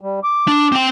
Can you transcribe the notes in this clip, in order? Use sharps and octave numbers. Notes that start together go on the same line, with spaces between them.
G3
D6
D4
C4 G5